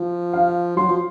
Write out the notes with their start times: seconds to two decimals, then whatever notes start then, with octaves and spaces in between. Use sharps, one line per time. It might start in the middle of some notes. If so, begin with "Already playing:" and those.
Already playing: F3
0.33 F5
0.76 F#3 C6
0.89 F3